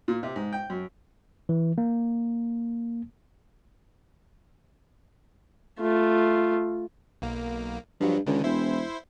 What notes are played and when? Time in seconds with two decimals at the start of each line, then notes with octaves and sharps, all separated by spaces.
0.08 A#2
0.23 C3
0.36 G#2
0.53 G5
0.70 F#2
1.49 E3
1.78 A#3
5.80 A3 F4
7.22 B1 A#3
8.01 G2 F3 F#3
8.27 C#2 D3 D#3
8.44 E1 E4 C5